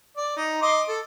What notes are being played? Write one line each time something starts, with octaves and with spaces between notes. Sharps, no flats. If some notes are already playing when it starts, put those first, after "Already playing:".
D5
D#4
D#5 C6 D6
A4